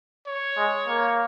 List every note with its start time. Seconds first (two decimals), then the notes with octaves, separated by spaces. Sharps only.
0.27 C#5
0.57 G#3
0.88 A#3